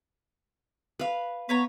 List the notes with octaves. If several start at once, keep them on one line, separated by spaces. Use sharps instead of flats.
B4 F5
B3 B4 C#5 A#5